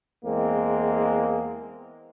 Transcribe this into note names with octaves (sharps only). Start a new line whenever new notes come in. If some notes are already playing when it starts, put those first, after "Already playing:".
E2 G#3 A#3 C4